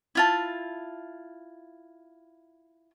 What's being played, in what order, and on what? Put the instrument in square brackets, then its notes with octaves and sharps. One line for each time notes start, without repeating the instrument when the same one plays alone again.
[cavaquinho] E4 F4 A5